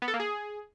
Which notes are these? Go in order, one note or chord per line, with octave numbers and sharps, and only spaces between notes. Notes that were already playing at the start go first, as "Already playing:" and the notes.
B3
A4
A#3
G#4